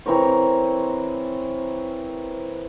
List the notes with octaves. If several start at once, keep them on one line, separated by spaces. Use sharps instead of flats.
E3 C4 A#4 C#5